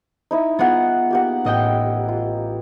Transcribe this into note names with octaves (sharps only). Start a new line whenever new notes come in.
D#4 E4 D#5
B3 F4 G#4 F#5
A#3 G4 F#5
A1 D#5 G5
F4